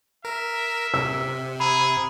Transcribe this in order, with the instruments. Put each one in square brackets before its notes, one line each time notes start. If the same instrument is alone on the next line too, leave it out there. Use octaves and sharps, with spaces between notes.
[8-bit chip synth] A#4 [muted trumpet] E5
[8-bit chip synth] C3 [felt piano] E6
[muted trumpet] G#4 [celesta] A#5 B5